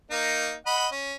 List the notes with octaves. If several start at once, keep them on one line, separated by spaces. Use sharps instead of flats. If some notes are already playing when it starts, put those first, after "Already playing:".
A#3 D#4
D#5 F#5 B5
C#4